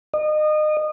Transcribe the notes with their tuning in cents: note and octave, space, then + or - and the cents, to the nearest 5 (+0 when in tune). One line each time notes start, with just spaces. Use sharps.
D#5 -30